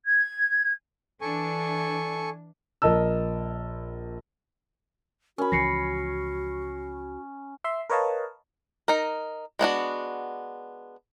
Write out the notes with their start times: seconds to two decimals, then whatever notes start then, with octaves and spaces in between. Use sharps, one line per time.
0.05 G#6
1.21 E3 D4 A4 G#5 C#6
2.82 A#1 A#4 D#5 A5 E6
5.38 C#4 F#4 A#4 B5
5.52 C#2 E3 F3 A#6 C7 C#7
7.64 E5 C6
7.90 A#4 B4 C#5 D#5 F5 A5
8.88 D#4 A#4
9.59 G#3 B3 D4 F#4